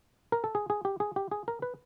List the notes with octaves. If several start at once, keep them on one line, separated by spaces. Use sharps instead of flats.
A#4
A4
G#4
G#4
G4
G#4
G4
G#4
A#4
B4